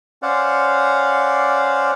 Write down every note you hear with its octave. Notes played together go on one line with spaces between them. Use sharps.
C#4 C5 D5 F5 F#5